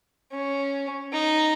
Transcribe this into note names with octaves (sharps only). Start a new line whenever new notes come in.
C#4
D#4